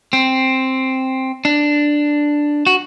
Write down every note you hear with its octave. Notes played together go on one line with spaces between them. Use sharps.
C4
D4
F#4